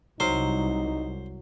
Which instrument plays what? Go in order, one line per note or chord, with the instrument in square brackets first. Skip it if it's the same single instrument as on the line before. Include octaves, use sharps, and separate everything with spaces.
[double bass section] C2 [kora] F#3 F5 [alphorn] D#4 [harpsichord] C5